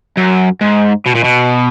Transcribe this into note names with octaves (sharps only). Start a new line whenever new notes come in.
F#2
G#2
B2
A#2
B2